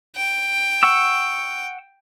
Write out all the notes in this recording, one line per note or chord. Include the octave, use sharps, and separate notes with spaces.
G5
F#5 C#6 E6